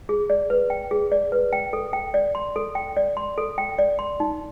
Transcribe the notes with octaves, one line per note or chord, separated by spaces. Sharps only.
G#4
D5
B4
G5
G#4
D5
B4
G5
A4
G5
D5
C6
A4
G5
D5
C6
A4
G5
D5
C6
D#4